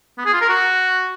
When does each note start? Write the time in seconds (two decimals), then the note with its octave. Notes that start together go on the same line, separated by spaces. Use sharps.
0.18 B3
0.26 G#4
0.33 F4
0.41 A#4
0.49 F#4